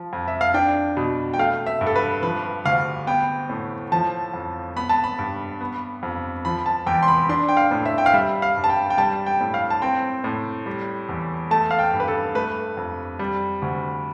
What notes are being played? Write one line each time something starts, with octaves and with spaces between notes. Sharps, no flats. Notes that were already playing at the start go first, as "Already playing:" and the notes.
Already playing: F3
F2
E5
F5
D4 G5
B2
G5
A3 F5
E5
G2
A4
B4
F3 B4
D2 F5
B3 G5
A2
F3 A5
F2
B3 B5
A5
B5
G2
B3
F2
F3 B5
A5
E2 G5
C6
B5
D4 C6
G5
F5
A2
E5
G5
F5
G3 E5
F5
G2
A5
G5
G5
G3 A5
G5
A2
F5
A5
C4 G5
A2
G3
E2
A3 A5
F5
G5
G2
B4
A4
A3 B4
F2
G3
D2